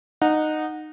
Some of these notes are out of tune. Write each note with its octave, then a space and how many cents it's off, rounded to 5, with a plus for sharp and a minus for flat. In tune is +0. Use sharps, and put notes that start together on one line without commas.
D#4 -15 F#5 -15